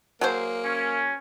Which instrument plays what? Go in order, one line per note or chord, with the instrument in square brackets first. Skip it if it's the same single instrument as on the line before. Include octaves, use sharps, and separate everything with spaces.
[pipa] F#3 G#4 C5 [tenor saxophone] A#3
[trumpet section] C#4